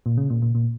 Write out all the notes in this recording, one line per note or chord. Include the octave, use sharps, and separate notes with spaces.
A#2
C#3
A#2
A#2
A#2